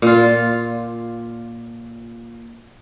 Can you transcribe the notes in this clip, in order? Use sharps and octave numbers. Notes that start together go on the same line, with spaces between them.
A#2 F4